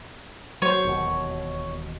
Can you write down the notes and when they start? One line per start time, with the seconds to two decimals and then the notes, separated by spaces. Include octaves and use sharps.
0.62 F#3 C5 C#5
0.85 E1 D#2 B2